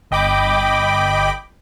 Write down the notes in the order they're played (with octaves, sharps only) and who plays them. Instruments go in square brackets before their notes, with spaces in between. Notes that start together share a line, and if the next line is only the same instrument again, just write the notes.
[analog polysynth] G1 D#5 G5 B5 D6